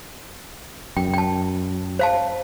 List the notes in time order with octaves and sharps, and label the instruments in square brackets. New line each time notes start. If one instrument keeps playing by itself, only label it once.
[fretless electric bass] F#2 [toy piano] G5
[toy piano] G5 A5
C5 F5 A5